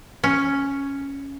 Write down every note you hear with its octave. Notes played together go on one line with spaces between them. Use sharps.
C#4